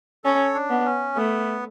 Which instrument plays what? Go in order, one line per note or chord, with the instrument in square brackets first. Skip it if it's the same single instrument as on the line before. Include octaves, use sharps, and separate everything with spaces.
[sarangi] C#4 [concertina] A4 C#5
[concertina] D4
[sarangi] B3
[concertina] C#4
[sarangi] A3 [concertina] B3